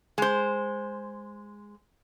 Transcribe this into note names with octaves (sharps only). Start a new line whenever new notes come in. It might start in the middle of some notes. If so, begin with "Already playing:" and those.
G#3 C5